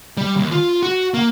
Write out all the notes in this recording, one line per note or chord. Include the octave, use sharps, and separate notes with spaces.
G3
D#2
F4
F#4
A#3